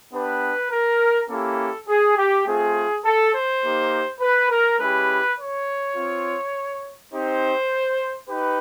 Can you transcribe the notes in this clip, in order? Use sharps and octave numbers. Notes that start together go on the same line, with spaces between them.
B3 D4 G4 B4
A#4
A#3 C#4 E4 G4 A4
G#4
G4
A3 C4 F4 G#4
A4
C5
A#3 D#4 G4
B4
A#4
G#3 C#4 E4 G4 B4
C#5
C4 F4
C4 D#4 G4 C5
D#4 G4 B4